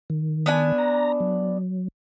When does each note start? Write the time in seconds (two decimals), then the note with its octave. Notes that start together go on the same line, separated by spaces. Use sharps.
0.10 D#3
0.46 B3 D4 G#5
0.78 A#5 A#6
1.20 F#3